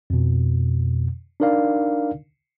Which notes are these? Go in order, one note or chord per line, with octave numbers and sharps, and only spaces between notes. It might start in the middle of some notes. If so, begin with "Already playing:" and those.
F2 B2
D4 D#4 A#4 D5 F5